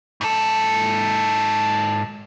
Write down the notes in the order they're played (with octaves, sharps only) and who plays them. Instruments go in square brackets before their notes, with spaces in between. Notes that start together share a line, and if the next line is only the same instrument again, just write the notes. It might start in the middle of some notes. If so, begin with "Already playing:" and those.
[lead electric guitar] G#2 A4